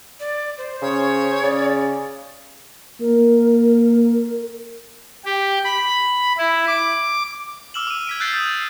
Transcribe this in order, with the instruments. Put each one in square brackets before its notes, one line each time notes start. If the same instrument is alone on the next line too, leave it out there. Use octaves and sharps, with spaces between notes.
[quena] D5
C5
[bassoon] C#3 [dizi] C#5
[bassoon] C#3 [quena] D5
[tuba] A#3 [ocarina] A#4
[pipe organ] G4
B5
E4
D6
[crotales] D6 E6 F6 E7 F#7
D6 D#7
G#6 B6 D7
E6 F#6 G6 A6 C7 D7
D#6
C7